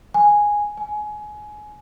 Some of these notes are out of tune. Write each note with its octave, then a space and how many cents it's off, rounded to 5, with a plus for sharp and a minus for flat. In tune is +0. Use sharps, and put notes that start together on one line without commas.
G#5 -5
G#5 +20